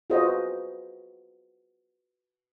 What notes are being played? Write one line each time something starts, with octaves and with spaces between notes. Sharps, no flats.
F4 F#4 G#4 B4 C5 D#5